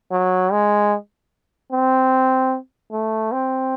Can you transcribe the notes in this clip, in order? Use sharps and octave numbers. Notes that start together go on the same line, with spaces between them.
F#3
G#3
C4
A3
C4